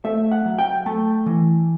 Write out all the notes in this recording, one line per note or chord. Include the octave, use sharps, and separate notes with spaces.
A3 E5
F#5
F#3
G5
A3 A5
E3